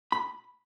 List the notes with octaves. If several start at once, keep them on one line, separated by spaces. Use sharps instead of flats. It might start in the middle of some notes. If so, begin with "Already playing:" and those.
B5